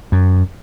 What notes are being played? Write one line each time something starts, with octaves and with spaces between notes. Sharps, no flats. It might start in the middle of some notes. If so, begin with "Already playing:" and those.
F#2